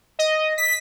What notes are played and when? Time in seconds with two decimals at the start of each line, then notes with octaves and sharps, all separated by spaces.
0.19 D#5
0.58 B6